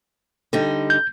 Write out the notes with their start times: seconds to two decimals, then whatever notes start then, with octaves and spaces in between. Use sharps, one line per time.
0.53 D3 G3 D#4
0.90 G6